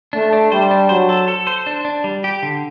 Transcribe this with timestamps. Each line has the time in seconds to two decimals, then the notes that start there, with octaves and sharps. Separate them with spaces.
0.13 A3 D4
0.33 D4
0.52 G3 C5
0.71 D4
0.89 F#3 C5
1.09 A4
1.28 A4
1.47 C5
1.66 D4
1.85 D4
2.04 G3
2.24 G4
2.43 D3